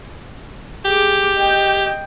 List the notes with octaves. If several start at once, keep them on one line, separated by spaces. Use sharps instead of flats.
G4 G#4 D6
D#5 G5